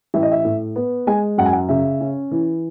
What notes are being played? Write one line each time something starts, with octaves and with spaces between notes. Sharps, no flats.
A1 E5
D#5
E5
A2
B3
G#3 G#5
F#2 F#5
G#5
F#5
C#3 E5
C#4
E3